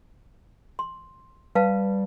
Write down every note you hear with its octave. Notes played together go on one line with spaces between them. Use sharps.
C6
G3 B4 F5 A5